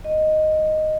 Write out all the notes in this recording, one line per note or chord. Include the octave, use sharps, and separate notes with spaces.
D#5